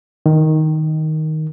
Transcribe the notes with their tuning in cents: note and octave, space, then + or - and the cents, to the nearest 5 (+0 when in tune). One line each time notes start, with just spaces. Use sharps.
D#3 +5